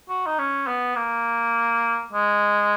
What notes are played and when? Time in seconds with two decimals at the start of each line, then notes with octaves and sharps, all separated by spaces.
0.09 F#4
0.26 D#4
0.38 C#4
0.67 B3
0.96 A#3
2.13 G#3